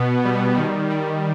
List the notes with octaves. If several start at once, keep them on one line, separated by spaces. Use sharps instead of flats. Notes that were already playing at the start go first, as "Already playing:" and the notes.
Already playing: B2 B3
G3
D#3
G3